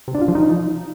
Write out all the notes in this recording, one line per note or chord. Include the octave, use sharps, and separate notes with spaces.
C3
D4
F4
F3
D#4